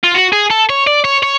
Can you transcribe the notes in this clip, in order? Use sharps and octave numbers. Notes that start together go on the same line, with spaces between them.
F4
F#4
G#4
A4
C#5
D5
C#5
C#5